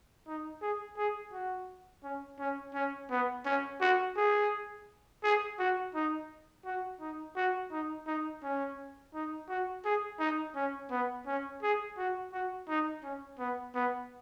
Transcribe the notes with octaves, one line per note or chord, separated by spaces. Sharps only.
D#4
G#4
G#4
F#4
C#4
C#4
C#4
B3
C#4
F#4
G#4
G#4
F#4
D#4
F#4
D#4
F#4
D#4
D#4
C#4
D#4
F#4
G#4
D#4
C#4
B3
C#4
G#4
F#4
F#4
D#4
C#4
B3
B3